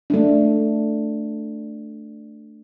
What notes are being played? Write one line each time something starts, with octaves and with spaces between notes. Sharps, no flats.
A3 D4